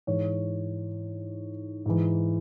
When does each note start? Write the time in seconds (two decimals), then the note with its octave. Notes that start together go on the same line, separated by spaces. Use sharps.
0.07 G#2 E3 C#5
1.86 G#2 E3